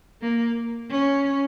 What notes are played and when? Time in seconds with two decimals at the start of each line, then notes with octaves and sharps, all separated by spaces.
0.22 A#3
0.90 C#4